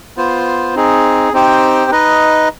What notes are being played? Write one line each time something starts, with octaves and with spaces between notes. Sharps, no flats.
B3 F4 C5
C4 D#4 G#4
C4 D#4 G4 C5 G5
D#4 B4 D#5